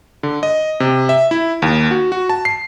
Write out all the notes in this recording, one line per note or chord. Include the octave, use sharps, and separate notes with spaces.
D3
D#5
C3
E5
E4
D#2
F#4
F#4
A5
C7